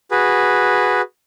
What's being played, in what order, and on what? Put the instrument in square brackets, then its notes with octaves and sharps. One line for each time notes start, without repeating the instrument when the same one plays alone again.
[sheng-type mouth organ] F#4 G#4 B4